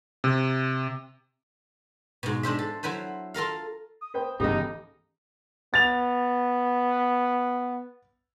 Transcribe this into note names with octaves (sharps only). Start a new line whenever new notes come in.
C3
G#2 B2
G#3 D4 C5 E5
A4
F#3 E4 B4 C5
F4 A4 A#4 F5
D#6
B4 C5 G5
G2 C#3 E3 A3 B3 D#4 G4 D#5
B3 A6 F7